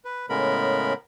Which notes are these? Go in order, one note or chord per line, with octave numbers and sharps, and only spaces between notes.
B4
A2 C#3 G#3 B3 A#4 B5